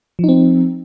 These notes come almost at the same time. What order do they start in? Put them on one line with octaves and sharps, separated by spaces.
F3 D#4 C4